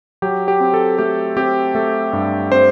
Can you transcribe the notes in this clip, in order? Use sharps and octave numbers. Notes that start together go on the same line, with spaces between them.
F#3 G4
G4
C4
A4
A3 G4
C4 G4
A3 A4
G2
C4 C5